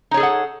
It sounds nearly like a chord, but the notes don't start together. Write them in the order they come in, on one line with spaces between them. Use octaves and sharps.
D#4 C#5 G#4 A4 F#5